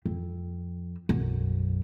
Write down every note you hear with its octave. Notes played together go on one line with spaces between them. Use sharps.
F2
B1 F#2